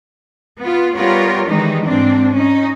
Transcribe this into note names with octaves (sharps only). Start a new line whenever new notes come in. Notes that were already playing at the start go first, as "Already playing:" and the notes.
B3 F4
G3 B3 F4 G4 A#4 C#5
D#3 E3 G3 G#3 D#4
G#2 C4 D4
C#4 D#4